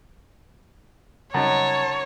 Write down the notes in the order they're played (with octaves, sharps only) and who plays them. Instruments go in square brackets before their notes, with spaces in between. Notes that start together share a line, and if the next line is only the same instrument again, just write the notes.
[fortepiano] F#2 D#4 [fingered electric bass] C#3 G3 C4 [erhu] C#5 [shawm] A5